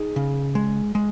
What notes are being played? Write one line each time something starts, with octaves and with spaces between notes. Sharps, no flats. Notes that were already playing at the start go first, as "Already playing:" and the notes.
Already playing: D#4 G#4
C#3
G#3
G#3